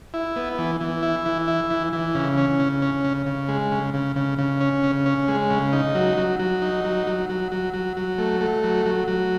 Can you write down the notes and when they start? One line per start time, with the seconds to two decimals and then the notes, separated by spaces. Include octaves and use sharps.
0.14 E4
0.36 B3
0.58 E3
0.80 E3
1.03 E4
1.25 E3
1.48 E4
1.70 E3
1.93 E3
2.15 C#3
2.38 C#4
2.60 C#3
2.82 C#4
3.04 C#3
3.26 C#3
3.48 G#3
3.72 C#3
3.94 C#3
4.16 C#3
4.38 C#3
4.61 C#4
4.83 C#3
5.06 C#4
5.28 G#3
5.50 C#3
5.73 D#4
5.95 F#3
6.17 F#3
6.40 F#3
6.62 D#4
6.85 F#3
7.07 F#3
7.29 F#3
7.52 F#3
7.74 F#3
7.97 F#3
8.18 A3
8.41 A3
8.63 F#3
8.86 F#3
9.08 F#3